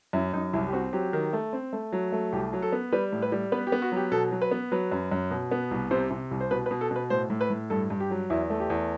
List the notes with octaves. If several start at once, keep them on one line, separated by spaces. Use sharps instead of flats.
F#2 E4
F#2 D#4
C2 E4
G4
C4 F#4
F#3 G4
D#3
A3
C4
A3
F#3
A3
C2 G4
F#3
A4
B3
G3 B4
A2
B4
G3
B3 B4
G4
B3
F#4
F#3 G4
B2 A4
F#3
B4
B3
F#3 B4
F#2
F#2
B2
B3
C2
C3 C5
C3
C2
C5
B2 B4
B4
B2
A4
B2 B4
A2 C5
A2
B4
A2
G2 A4
G2
G4
F#3
E2 E4
A3
G4
E2